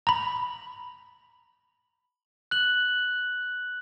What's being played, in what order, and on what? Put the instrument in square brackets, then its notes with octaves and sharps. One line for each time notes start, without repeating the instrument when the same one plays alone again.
[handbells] A#5 B5
[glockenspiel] F#6 F#7